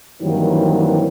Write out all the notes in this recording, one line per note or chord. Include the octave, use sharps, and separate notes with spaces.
G2 D#3 E3 F#3 A#3 C4